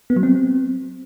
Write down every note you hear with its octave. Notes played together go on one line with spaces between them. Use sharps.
B3
F#3
C4